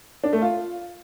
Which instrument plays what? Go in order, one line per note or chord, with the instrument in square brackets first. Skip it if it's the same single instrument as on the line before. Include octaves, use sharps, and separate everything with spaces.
[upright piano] D4
A3
F4